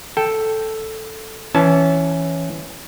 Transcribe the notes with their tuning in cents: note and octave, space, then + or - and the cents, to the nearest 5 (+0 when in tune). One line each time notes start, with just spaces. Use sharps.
A4 +0 G5 +0
E3 +0 C#4 +0 A5 -25